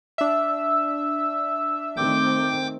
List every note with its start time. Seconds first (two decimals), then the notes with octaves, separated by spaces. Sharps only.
0.18 D4 E5 E6
1.97 D#3 A3 C4 G5 D6 G6